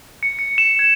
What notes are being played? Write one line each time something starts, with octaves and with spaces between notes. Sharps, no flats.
C#7
C#7
E7
G#6